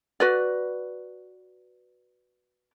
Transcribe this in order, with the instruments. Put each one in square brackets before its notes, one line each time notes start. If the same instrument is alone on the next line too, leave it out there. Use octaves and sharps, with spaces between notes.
[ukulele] F#4 B4 D5